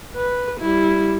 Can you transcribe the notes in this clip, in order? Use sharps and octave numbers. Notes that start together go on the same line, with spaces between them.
B4
G3 E4